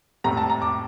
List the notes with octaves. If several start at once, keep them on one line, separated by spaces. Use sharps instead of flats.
A2 G3 C4 A#5
A5
A#5
D6